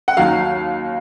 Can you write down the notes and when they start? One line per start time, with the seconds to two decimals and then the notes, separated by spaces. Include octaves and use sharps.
0.08 F#5
0.17 D#2 D#3 F#3 F5